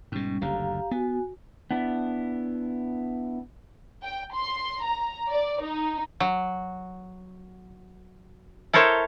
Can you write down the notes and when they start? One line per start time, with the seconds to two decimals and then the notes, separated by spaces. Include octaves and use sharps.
0.12 G#2 B2 G3 C#4
0.42 F#1 D2 D3 G4 F5 A#5
0.91 B3 F#4 G#5
1.71 B3 D4 E4
4.03 G5
4.34 C6
4.83 A#5
5.29 D5
5.62 D#4
6.20 F#3
8.73 E4 A4 A#4 C5 C#5